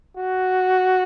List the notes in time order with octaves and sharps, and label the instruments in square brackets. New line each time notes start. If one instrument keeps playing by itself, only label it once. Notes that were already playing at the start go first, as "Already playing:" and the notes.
[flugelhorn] F#4